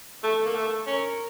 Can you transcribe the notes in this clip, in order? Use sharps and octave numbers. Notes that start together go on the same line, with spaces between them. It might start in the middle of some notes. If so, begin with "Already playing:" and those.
A3 A4
A#3
A3
C#4 A#4